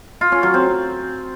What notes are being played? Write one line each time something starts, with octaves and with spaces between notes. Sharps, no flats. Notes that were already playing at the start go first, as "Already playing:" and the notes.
F4
C#4
F#3
C4